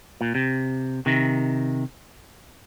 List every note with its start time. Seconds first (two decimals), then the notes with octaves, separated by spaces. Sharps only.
0.21 A#2
0.35 C3
1.06 C3 D#3